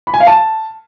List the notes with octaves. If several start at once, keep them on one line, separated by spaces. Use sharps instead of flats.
B5
G#5
F5
A5